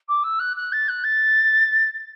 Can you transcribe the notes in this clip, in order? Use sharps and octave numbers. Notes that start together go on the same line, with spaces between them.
D6
E6
F#6
F#6
A6
F#6
A6